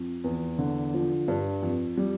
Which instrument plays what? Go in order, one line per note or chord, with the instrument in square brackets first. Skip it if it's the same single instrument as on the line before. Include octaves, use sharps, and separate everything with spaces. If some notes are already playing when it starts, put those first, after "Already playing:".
Already playing: [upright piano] F2
E2
D3
F3
G2
F2
G3